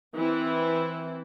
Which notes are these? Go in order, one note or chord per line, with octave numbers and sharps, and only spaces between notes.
E3 C4 E4